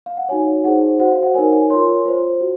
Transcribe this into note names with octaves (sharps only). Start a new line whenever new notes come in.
F5
F#5
D#4 F#4 C#5 G#5
D#4 G#4 C5 F#5
F#4 C5 F#5
F5
F#5
D#4 A#4 C#5 G#5
G#5
F4 A#4 C#5 C6
F4 C5
F#4